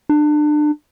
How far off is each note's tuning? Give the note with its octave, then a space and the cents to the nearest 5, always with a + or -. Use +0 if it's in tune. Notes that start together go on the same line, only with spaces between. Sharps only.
D4 +30